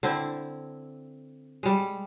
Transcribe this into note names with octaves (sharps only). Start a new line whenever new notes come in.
D3 C4 E4
G3 G#3